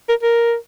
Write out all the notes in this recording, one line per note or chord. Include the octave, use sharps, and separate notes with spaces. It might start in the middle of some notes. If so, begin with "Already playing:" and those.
A#4
A#4